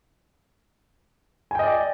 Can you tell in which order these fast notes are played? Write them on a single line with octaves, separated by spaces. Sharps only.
G#5 G5 D#5 D5